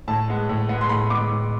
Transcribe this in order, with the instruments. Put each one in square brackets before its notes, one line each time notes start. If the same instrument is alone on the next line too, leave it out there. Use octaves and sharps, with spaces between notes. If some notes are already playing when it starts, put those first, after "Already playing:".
[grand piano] A2 A5
G#3 B3
A2
G#3 B3
C6
A2 B5
G#3 B3 D6
A2